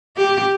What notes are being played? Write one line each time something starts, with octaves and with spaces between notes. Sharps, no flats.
G4